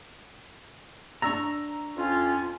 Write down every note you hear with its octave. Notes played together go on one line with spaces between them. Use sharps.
D4 A#5 C#6 E6 A#6
F2 C#4 F4